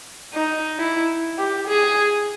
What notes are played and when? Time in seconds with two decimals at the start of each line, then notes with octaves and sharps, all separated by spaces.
0.34 D#4
0.79 E4
1.39 G4
1.68 G#4